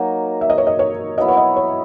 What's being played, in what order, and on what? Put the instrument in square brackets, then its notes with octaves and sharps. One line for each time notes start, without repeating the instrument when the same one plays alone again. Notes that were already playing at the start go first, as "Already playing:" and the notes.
Already playing: [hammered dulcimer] F#3 A#3 D#4 A#4
[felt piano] E5
D#5
C#5
D#5
C#5
[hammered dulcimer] F#3 B3 E4 [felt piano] D#5
[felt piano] C#5
D#5
C#5